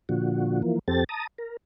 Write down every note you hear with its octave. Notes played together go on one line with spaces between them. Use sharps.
A#2 D3 F3 F#4
E3 F3 A#3
F2 C4 G4 A4 A6
A5 A#5 D#6
A#4